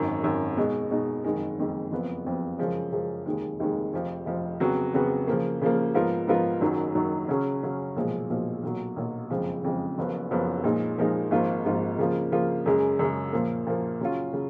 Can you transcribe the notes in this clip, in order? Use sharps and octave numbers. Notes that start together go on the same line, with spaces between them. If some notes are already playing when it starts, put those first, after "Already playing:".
Already playing: G#1 F#2 D#3
G#1 F#2 D#3
B2 G#3 D#4
B2 G#3 D#4
F#1 F2 D#3 G#3
F#1 F2 D#3 G#3
F#1 F2 F3 B3
F#1 F2 F3 B3
F#2 C#3 F3 G#3
F#2 C#3 F3 G#3
F1 D#2 D#3 G#3
F1 D#2 D#3 G#3
F1 F2 F3
F1 F2 F3
F2 C#3 F#3 B3 F#4
F2 C#3 F#3 B3 F#4
C#3 F3 A#3
C#3 F3 A#3
G#2 F3 B3 F4 A#4
G#2 F3 B3 F4 A#4
F#1 F#2 D#3 F#3
F#1 F#2 D#3 F#3
C#3 F#3 C#4
C#3 F#3 C#4
B1 A#2 F3 G#3
B1 A#2 F3 G#3
B1 A#2 F#3
B1 A#2 F#3
F#1 F2 C#3 F3 G#3
F#1 F2 C#3 F3 G#3
F#1 F#2 F3 B3
F#1 F#2 F3 B3
A#2 F3 G#3 D#4 A#4
A#2 F3 G#3 D#4 A#4
G#1 G#2 F3 A#3 F4
G#1 G#2 F3 A#3 F4
C#3 F3 A#3 F4
C#3 F3 A#3 F4
F#2 C#3 G#3
F#2 C#3 G#3
A#2 F3 A#3
A#2 F3 A#3
C#3 F#3 C#4 F4
C#3 F#3